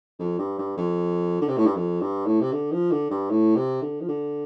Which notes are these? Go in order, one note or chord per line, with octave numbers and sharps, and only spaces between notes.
F2
G2
G2
F2
D3
C3
A2
G2
F2
G2
A2
C3
D3
F3
D3
G2
A2
C3
D3
F3
D3